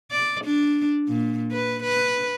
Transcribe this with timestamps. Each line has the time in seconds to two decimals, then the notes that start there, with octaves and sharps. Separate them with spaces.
0.12 D5
0.45 D4
1.08 A#2
1.52 B4
1.83 B4